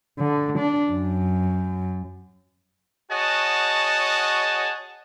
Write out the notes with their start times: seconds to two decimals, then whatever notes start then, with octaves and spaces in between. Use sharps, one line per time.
0.20 D3
0.59 D4
0.92 F#2
3.10 F#4 G#4 C#5 D#5 F#5 A5